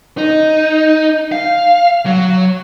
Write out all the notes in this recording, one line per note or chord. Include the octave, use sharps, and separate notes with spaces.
D#4
F5
F#3